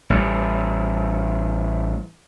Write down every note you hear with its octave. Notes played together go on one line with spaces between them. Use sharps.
A1 G3